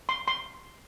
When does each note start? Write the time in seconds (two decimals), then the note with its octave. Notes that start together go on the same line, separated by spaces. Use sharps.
0.09 C6
0.28 C6